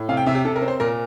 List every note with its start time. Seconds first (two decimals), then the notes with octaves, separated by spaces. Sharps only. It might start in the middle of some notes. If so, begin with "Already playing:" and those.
Already playing: A2
0.09 C3 F5
0.17 G5
0.26 C3 E5
0.35 G4
0.45 C3 A4
0.56 A#4
0.62 C4
0.68 C5
0.80 A#2 A#4